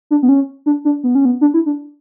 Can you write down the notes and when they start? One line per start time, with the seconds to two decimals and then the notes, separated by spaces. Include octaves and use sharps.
0.11 D4
0.23 B3
0.29 C#4
0.66 D4
0.85 D4
1.04 B3
1.15 C#4
1.25 B3
1.41 D4
1.54 E4
1.66 D4